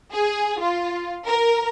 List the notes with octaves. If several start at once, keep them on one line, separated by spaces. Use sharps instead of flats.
G#4
F4
A#4